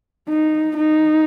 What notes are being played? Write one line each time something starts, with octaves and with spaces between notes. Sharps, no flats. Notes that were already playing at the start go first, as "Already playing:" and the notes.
D#4
D#4